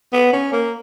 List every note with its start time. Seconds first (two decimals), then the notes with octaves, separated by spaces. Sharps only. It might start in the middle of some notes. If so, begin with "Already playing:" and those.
0.13 B3
0.33 C#4
0.53 A#3